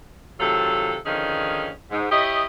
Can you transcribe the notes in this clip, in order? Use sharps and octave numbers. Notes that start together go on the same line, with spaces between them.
C3 D#3 F#3 F4 A4
D3 D#3 F3 C#4 D#4 G#4
G#2
E4 G4 C#5 D#5